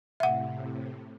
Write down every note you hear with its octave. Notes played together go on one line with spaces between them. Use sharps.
A2 C3 E5 F#5